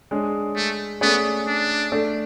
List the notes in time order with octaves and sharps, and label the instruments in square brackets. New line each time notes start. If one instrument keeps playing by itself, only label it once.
[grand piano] G#3 D4 G#4 C#5
[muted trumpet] A3
[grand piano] A3 C#4 G#4 D5 [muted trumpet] B3
[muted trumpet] D4
[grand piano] A3 D4 A4 D5